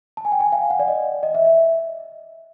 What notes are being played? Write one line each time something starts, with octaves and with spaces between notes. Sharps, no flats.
A5
G#5
G5
G#5
F5
F#5
D5
D#5
D#5
E5
E5